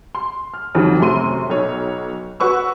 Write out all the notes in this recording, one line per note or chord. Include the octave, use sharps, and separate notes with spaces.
C6
F6
F2 D3 D#3 F#3 G3
F#2 C3 A3 C6 D#7
B1 C#5
F#4 B4 C#6 E6